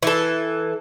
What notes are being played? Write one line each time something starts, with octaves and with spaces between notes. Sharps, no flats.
E3 A4